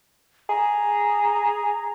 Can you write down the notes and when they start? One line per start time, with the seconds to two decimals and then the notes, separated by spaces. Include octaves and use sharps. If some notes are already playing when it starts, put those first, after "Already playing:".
0.50 G#4 A#5